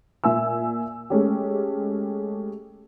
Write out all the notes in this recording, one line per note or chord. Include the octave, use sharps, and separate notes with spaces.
A#2 E5 G#5 E6
G#3 A3 C#4 G4